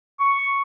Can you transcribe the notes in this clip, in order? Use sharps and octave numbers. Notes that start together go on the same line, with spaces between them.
C#6